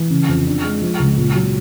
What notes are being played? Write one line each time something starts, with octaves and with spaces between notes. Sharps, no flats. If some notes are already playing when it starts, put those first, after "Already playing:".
Already playing: E3
C#3
F2
D4
G#3
F3
C#2
A#2
F#3